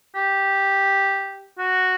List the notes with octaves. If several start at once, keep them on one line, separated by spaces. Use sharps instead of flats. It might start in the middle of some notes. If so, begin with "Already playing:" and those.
G4
F#4